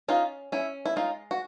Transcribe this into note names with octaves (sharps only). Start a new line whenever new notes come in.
C#4 D#4 F4
C#4 E4
E4
G#3 D#4 F4
F#4